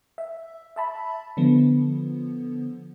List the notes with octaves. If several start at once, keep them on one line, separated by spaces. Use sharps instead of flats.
E5
E5 A5 B5
D3 F3 B3